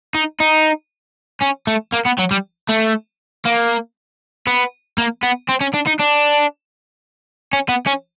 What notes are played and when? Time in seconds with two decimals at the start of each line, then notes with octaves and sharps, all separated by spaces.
0.15 D#4
0.40 D#4
1.42 C#4
1.67 A3
1.92 A#3
2.05 B3
2.18 F#3
2.31 G3
2.69 A3
3.46 A#3
4.47 B3
4.98 A#3
5.23 B3
5.49 C4
5.61 C#4
5.74 D4
5.87 D#4
6.00 D4
7.53 C#4
7.69 B3
7.86 C#4